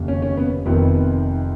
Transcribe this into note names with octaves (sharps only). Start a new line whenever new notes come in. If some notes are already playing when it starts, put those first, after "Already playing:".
Already playing: F1 D#2 C#3
C#4
C#4
B3
F1 F2 D#3 B3